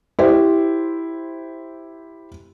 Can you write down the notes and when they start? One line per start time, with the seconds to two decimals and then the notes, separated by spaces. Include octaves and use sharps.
0.19 E4 G4 C5